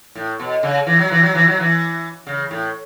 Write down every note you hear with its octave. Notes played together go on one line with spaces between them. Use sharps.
A2
B2
C#3
E3
F#3
E3
F#3
E3
F#3
E3
C#3
A2